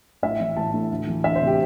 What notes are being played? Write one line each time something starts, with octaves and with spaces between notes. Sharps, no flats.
A1 E5
E3
A1 A5
A2
D2
E3
D2 E5
C5
C3
G4